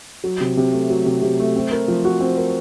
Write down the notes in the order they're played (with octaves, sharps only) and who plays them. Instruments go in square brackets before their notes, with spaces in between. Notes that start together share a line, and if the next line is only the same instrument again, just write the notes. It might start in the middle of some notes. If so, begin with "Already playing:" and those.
[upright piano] F#3
C3
C3
A3
F#3
C3
C3
A3
C4
A#4
F3
F#4
C4
A#4